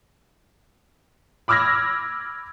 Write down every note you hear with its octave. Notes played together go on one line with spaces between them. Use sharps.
B5 D6 E6 F6 G#6 A#6